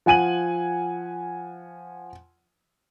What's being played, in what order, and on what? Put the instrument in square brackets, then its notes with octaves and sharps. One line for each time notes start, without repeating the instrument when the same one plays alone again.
[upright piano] F3 F#5 G#5 D#7 F#7